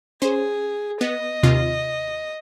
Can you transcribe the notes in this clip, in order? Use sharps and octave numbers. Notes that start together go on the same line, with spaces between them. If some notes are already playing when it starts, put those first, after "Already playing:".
C#4 G#4 C5
B3 D#5
D#2 C3 F4